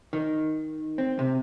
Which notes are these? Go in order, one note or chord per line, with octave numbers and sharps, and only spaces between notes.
D#3
C4
C3